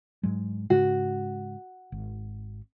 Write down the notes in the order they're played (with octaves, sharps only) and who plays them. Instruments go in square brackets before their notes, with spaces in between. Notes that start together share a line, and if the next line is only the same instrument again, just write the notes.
[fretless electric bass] G#2 F#3 G#3
[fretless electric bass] G#2 C#3 G#3 [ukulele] F#4
[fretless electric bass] G#1